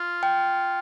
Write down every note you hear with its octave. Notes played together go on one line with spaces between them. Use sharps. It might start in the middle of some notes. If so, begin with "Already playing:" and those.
Already playing: F4
G5